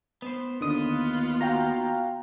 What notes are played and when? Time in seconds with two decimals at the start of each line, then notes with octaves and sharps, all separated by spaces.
0.22 B3 C5
0.61 D#2 D3 B3 F4 D#6
1.41 F#4 F5 G5 A#5